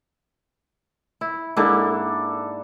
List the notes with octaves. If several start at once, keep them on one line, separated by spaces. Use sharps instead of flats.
E4
G#2 A#3 D4 E4 A4